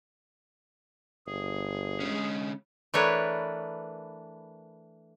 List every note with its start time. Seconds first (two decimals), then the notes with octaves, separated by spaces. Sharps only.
1.27 G1 G#4
2.00 D3 G#3 C#4
2.94 E3 A3 D4 A#4 B4 C#5